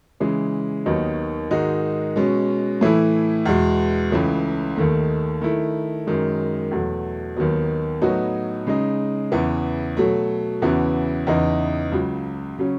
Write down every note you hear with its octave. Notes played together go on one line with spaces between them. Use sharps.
C#3 E3 G#3
D#2 D#3 F#3 B3 D#4
G#2 D#3 G#3 D#4 F#4
B2 G#3 C#4
A2 E3 A3 E4
E2 B2 G#3
C#2 C#3 E3 A3
D#2 D#3 A3
D#3 A3 E4
F#2 D#3 G#3
E2 B2 F#3 A3
D#2 D#3 F#3 B3
A2 F#3 B3 D#4 F#4
C#3 G#3 D#4
E2 C#3 E3 B3
B2 F#3 A3
E2 C#3 E3 B3 F#4
E2 C#3 E3 B3 D#4
C#2 C#3 F#3
C#3 F#3 C#4